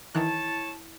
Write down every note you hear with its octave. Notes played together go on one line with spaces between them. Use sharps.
D#3 E3 E4 C#5 A5 F#6